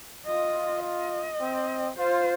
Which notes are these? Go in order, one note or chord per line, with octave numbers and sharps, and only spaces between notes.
F4 D#5
D#5
C4
F4 C5